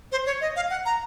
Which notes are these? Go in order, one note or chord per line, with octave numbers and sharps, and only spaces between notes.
C5
C#5
D#5
F5
F#5
A#5